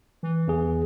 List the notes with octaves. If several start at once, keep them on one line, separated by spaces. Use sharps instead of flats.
E3
E2 G#4